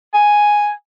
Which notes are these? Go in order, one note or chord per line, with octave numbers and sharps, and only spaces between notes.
G#5